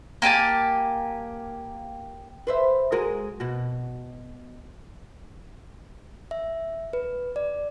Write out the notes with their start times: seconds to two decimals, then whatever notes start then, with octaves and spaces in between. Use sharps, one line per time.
0.22 A#3 G4 G#5 A5
2.47 B4 C5 E5
2.92 G#3 F#4 A#4
3.40 B2 F#4
6.31 E5
6.93 B4
7.36 D5